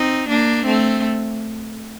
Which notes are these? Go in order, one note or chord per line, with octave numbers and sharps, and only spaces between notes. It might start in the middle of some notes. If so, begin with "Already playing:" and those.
Already playing: C4 D#4
A#3 D4
A3 C4